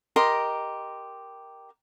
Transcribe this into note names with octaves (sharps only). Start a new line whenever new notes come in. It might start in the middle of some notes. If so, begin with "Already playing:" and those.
G4 A#4 D#5 C6